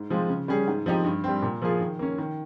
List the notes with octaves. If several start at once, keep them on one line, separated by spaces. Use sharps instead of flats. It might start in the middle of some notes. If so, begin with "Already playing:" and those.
Already playing: G#2
F3 G#3 C4 F4
C#3
G3 C#4 G#4
G#2
F3 C4 D#4 G4
G2
G3 C4
A#2
F3 A#3 F4 G#4
D#3
A#3 C#4
D#3